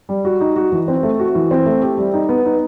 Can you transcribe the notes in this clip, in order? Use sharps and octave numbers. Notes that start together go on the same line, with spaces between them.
G3
F#4
D#4
F#4
E3
C4
A3
F#4
E3
C4
A3
G4
G3
D#4
B3
D#4